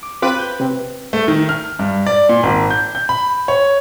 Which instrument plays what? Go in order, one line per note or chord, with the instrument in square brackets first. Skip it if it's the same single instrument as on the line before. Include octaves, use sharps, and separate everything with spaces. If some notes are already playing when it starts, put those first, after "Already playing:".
[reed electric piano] D6
[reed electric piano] C4 F4 D6 [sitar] B4
[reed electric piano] G6
C3 C4
[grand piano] A3
D#3
F6
G2
D5
A#2
G#1
G6
G6
B5
C#5